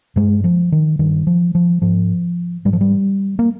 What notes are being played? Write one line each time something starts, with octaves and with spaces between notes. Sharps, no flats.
G2 G#3
F3
D#3
G2 D#3
F3
F3
G#2 F3
G#2 G3
F3
G3
A#3